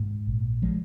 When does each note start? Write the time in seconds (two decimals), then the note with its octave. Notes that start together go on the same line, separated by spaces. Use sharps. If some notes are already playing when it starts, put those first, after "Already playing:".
Already playing: G#2
0.27 A#1
0.62 F3 G#3